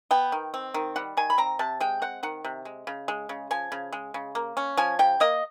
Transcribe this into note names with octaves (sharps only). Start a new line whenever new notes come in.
B3 G5
D#3
C4
D#3
G3 F#5
D#3 G#5
B5
C4 A#5
C3 A5
G#3 G5
C4 F#5
D#3 F#5
C3
G#3
C#3
G#3
C#3
F3 G#5
C#3
G#3
C#3
A#3
C#4
F3 G#5
C#3 G5
A#3 D#5